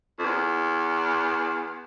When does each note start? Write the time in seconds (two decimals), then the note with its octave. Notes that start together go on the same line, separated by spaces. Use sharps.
0.19 F2
0.25 E2